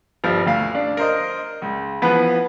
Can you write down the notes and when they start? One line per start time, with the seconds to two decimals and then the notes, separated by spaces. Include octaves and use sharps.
0.24 G1 F3 G3 F6
0.46 D2 F5 F6
0.75 D4
0.97 A#4 C5 D#5
1.62 C#2
2.02 E3 F3 B3 B4